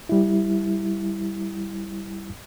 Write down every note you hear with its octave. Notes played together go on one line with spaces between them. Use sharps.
G3 E4